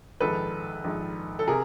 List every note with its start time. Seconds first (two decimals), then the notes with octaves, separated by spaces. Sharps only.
0.20 A#1 G#2 D#3 A4 B4
0.84 A#1 G#2 D#3
1.39 A4
1.48 C3 G#4 A#4